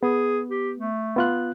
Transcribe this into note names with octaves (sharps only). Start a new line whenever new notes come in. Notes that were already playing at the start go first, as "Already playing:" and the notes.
B3 G#4
G4
A3
B3 F4 F#6